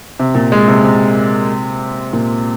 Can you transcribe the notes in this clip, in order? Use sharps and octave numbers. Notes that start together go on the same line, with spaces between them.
C3
A#2
G#3
C3
C3
A#2